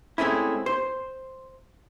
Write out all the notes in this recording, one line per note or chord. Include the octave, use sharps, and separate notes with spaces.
G#3 A3 C4 C#4 E4
C5